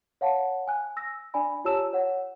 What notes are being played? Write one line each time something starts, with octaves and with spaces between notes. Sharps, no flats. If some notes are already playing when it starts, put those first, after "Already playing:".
C#5 F5 F#5 A5
G#5 F#6
E6 A#6
D4 D5 G#5 B5
F4 G4 C#5 A5 E6 E7
C#5 F#5